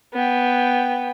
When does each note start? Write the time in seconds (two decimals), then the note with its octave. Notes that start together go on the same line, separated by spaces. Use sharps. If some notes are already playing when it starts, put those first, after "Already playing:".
0.13 B3 G5